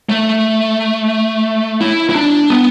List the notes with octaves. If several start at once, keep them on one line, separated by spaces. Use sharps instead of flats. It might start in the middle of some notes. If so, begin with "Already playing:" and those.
A3
E4
E4
D4
B3